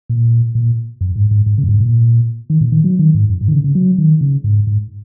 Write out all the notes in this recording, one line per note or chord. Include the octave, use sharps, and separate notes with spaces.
A#2
A#2
F#2
G#2
G#2
G#2
C#3
F#2
G#2
A#2
D#3
A#2
D#3
F#3
D#3
G#2
F#2
G#2
D#3
C#3
C#3
F#3
D#3
C#3
G#2
G#2